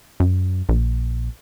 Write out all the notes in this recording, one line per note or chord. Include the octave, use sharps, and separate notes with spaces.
F#2
A#1